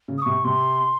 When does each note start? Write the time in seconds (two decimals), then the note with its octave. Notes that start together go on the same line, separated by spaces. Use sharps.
0.08 C#3
0.18 D#6
0.22 C3 C#6
0.44 C3 C6